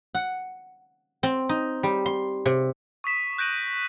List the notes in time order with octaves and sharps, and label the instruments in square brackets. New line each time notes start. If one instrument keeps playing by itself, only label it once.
[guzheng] F#5
C4
D#4
G3
C6
C3
[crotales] C#6 D#6 B6 E7
F#6 G6 A#6 D7 D#7 F#7